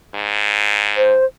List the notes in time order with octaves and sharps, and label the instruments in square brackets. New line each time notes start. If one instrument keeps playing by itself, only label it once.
[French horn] G#2
[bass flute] C5